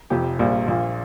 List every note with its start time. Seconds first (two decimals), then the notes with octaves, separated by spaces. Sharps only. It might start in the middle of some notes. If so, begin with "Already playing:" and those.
0.10 F1 F2 C3 F3 G4
0.39 A#1 A#2 G3 A#3
0.68 A#1 A#2 F3 A#3